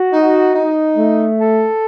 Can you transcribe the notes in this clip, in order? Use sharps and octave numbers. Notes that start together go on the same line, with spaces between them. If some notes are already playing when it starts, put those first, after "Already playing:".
Already playing: F#4
D#4
D#4
A3
A4